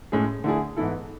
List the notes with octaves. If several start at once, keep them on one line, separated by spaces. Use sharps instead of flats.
A2 G#3 C#4 G#4
D3 A3 E4 G#4
G#2 E3 B3 E4 A4